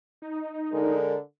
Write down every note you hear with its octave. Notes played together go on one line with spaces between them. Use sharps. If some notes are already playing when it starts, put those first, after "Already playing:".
D#4
D3 G#3 A#4